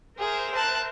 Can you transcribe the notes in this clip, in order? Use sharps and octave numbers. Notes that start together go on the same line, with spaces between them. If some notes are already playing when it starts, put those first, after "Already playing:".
G#4 A#4 C5 E5
A5 F#6